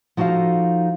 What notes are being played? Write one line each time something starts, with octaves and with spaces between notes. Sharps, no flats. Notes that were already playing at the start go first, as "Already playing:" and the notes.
F3 D#4 F#4 A4 F5